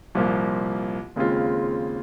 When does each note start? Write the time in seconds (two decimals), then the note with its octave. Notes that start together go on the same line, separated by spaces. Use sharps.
0.15 C2 A#2 F3 A#3
1.16 D#2 C#3 G#3 C4 F4